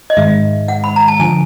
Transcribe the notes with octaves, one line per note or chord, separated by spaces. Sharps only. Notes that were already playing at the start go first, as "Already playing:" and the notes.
D#5
G#2 D#3 G#3 E5
F#5
B5
A#5
A5
D3 F3 G#5